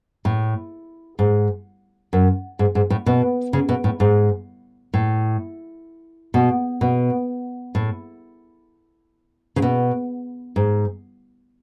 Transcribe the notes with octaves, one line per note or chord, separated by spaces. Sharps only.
A2
G#2
F#2
G#2
G#2
A2
B2
C#3
B2
A2
G#2
A2
B2
B2
A2
C#3
B2
G#2